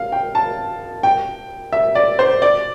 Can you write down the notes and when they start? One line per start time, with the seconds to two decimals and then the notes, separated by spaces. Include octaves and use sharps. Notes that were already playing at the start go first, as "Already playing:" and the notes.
Already playing: F5
0.12 G5
0.35 A5
1.03 G5
1.73 E5
1.95 D5
2.19 C5
2.42 D5